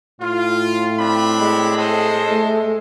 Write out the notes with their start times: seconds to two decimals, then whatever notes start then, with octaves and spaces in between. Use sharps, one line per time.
0.21 A2 F4
0.98 C4 D4 B5
1.38 G#3
1.76 A4 C5 D#5
2.29 A3